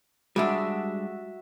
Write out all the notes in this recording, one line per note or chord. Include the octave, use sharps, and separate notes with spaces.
G3 G#3 D4 F#4 E5